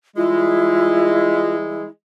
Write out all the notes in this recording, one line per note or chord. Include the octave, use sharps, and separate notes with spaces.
E3 G3 G#3 E4 F4